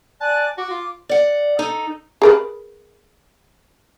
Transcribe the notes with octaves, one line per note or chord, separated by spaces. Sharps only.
D5 G#5 A5 F#6
F#4 D6
F4
D5 F#5
D#4 A4
G#4 A#4 B4